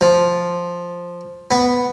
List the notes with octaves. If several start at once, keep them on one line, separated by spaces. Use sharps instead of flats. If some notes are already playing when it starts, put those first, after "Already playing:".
F3
B3